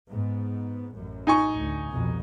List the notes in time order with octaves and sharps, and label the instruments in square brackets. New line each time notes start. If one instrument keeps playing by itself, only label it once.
[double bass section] G#2 B3
A1 F#2
[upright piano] D#4 G#5 C#6
[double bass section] D2
C2 F2 B2